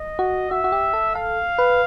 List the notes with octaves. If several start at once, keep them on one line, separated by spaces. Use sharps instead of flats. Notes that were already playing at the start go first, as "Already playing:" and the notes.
Already playing: D#5
F#4
F#4 E5
F#4
G4
A4
A4 F5
B4